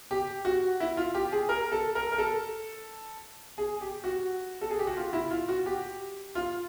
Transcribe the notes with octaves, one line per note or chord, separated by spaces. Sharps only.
G4
F#4
E4
F4
G4
G#4
A#4
A4
A#4
A#4
A4
G#4
G4
F#4
A4
G#4
G4
F#4
F4
E4
F4
F#4
G4
F4